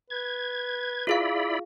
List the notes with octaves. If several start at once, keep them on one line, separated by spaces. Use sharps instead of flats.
B4 G#6
E4 F4 G#4 D5 F5 B5